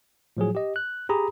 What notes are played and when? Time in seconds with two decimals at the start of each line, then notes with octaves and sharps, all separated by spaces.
0.37 A2 F3 F#3 G#4
0.55 G4 D#5
0.76 F#6
1.09 G4 G#4 A#5 B5 D#6